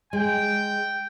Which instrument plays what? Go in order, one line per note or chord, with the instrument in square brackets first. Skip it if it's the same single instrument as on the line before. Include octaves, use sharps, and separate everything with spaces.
[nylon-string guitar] G#3 [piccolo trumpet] G5